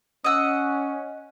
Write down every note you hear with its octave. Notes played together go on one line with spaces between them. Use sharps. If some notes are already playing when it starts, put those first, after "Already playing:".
C#4 D#5 F#5 D#6 E6